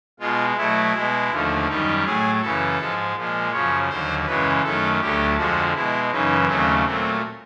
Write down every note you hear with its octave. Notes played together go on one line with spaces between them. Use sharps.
B2 G#3 F4
B2 F#3 A3 E4
B2 G#3
D#2 D3 F3 A3
F#2 D#3 G3 D#4
A2 F#3 A3 G#4
F#2 C#3 E3 A4
G#2 F3 G#3
A#2 F3 G#3
F#2 C#3 F3 C#5
D#2 D3 F#3 C5
F#2 C#3 E3 G#3 B4
F#2 D#3 F#3 A3 A4
D2 D3 F#3 A3 G4
F2 D3 F3 G#3 F#4
B2 G#3 E4
F#2 C#3 E3 D#4
D#2 C#3 F#3 A3 C4
A#2 F#3 A3 C4